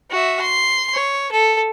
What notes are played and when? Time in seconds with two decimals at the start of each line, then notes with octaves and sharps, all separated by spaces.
0.11 F#4 E5
0.42 C6
0.93 C#5
1.32 A4